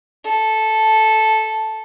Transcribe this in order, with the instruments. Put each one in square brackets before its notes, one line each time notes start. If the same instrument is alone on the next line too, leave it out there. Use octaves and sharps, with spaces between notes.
[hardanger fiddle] A4